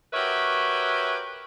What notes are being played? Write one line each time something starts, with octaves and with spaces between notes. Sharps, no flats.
F#4 G4 A#4 B4 C#5 E5